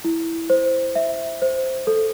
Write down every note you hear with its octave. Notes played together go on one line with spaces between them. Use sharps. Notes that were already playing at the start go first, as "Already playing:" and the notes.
E4
C5
E5
C5
A4